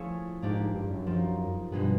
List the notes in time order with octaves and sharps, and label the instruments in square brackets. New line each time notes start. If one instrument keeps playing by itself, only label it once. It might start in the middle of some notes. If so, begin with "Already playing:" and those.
Already playing: [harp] F3 A3 C#4 E4 G#4
[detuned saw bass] G#2 [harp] A#3 D4 G4
[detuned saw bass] G2
F#2
[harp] F3 A#3 D#4
[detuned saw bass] G2 [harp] B2 G#3 B3